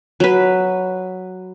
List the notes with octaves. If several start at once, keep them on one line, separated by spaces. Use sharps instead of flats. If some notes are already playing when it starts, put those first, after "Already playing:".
F#3 B4